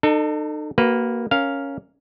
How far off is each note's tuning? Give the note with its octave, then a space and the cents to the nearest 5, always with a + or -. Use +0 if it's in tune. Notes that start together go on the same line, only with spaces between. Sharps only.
D#4 -35 A4 +20
A#3 +0 F#4 +30 B4 +0
C#4 +0 A#4 +0 F5 +0